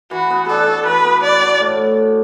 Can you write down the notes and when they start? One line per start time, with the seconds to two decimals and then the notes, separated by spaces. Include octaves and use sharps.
0.11 E3 F#4
0.30 B3
0.49 D4 A4
0.67 F#4
0.85 E3 B4
1.04 B3
1.23 D4 D5
1.41 F#4
1.60 A2